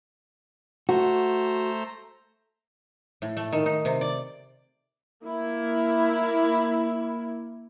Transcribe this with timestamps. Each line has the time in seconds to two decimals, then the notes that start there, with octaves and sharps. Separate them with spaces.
0.89 A3 F#4 C5 A#5
3.22 A2
3.37 A3
3.53 D#3
3.66 D#4
3.85 C3
4.01 D5
5.23 A#3 E4